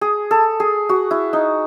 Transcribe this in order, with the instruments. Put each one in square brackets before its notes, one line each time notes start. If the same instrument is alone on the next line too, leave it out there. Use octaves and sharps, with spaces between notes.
[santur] G#4
A4
G#4
F#4
E4
D#4